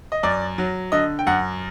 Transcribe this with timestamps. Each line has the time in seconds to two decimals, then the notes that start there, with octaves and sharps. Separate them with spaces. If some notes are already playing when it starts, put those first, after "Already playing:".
0.12 D#5
0.23 F#2 D5
0.58 F#3
0.92 D3 D#5
1.19 G5
1.27 F#2 F#5